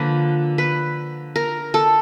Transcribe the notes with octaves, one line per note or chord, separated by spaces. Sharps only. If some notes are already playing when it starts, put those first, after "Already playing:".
Already playing: D3 F3 A#3 B4
B4
A#4
A4